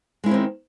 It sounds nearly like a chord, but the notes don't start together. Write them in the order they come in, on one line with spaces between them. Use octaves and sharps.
G#3 E4 C#4 C4 D#3